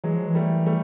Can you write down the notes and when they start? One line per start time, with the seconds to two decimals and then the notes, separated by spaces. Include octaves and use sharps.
0.04 E3 F#3 G#3
0.15 F3
0.27 E3
0.35 G3 A3
0.66 G3 A3